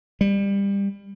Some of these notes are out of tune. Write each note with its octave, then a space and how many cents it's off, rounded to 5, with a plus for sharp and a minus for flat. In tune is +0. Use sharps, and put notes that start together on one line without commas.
G3 +25